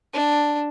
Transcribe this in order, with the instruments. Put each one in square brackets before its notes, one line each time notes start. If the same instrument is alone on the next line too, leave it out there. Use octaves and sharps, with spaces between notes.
[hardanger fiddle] D4